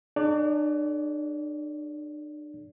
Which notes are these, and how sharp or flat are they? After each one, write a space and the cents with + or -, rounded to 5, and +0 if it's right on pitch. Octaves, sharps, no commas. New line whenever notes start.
D4 +40 G#4 +25 D5 -35